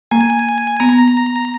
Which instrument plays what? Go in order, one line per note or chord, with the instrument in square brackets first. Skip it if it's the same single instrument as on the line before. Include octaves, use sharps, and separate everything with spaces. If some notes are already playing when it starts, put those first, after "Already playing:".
[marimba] A#3 [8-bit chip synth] G#5
[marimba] B3 [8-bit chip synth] A#5